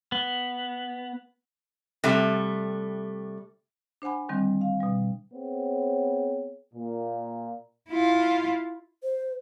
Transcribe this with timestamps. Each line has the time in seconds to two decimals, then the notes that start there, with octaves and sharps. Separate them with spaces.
0.12 B3
2.04 C3 G3 A3
4.02 D4 C5 F#5 G#5 B5
4.29 D3 D#3 G3 C4
4.61 F5
4.81 B2 G3
5.34 B3 C4 G#4 C5 C#5
6.74 A#2
7.90 E4 F4
9.03 C5